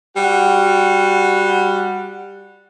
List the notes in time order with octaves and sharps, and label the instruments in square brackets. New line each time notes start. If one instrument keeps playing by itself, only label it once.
[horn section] G3 F#4 F#5